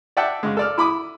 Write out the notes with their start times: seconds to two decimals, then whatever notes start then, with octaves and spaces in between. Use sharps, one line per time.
0.17 D5 E5 F#5 G5 A5
0.43 C#3 G#3
0.57 A4 D5 F6
0.78 E4 B5 D6 D#6